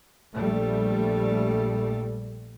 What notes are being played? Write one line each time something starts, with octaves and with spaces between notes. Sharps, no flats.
A#1 G3 A3